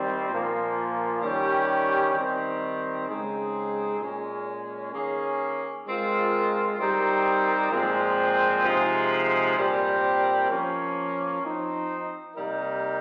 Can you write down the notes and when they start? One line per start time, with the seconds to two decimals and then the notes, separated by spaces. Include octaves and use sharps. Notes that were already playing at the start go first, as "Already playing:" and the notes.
Already playing: D#3 G3 C4
0.29 A#2 F3 A#3
1.22 D#3 G3 C#4 G4
2.15 D#3 G3 C4
3.07 C#3 G#3 C4 D#4 G#4
4.00 A#2 G#3 C#4 G#4
4.93 D#3 A#3 C#4 G#4
5.86 G#3 C4 F4 A#4
6.79 G3 C4 D#4 G4 A#4
7.72 A#2 F3 G#3 C4
8.64 C3 F3 G#3 D#4 G#4
9.57 A#2 G3 C4 G4 A#4
10.50 F3 A#3 C#4
11.43 F3 C4 D#4
12.36 C3 G3 A#3 D#4 A#4